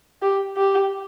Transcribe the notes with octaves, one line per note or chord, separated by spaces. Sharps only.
G4
G4